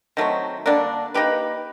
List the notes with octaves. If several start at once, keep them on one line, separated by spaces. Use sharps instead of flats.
D#3 F#3 A3 C4
D3 G3 A#3 D4
A#3 D#4 G4 B4